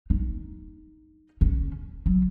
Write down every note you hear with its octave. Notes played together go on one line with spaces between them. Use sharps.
D#4
C#4
F#3